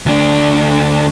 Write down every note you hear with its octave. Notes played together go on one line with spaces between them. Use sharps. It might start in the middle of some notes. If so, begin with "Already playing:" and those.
D2 D4